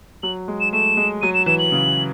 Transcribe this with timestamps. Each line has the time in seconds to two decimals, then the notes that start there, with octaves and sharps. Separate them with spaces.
0.23 F#3 F#7
0.48 G#3
0.60 E7
0.72 A3 E7
0.97 G#3
1.21 F#3 D#7
1.34 E7
1.46 E3 E7
1.59 F#7
1.72 C#3